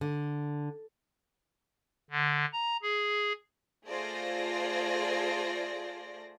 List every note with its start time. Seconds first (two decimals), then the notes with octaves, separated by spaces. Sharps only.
0.01 D3
2.11 D3
2.53 A#5
2.82 G#4
3.86 A3 F4 G#4 C5 D5 A#6